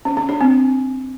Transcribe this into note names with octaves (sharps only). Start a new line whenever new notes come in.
C#4
C#4
D4
C4